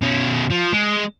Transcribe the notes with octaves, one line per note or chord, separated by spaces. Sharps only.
B2 C#4
F3
G#3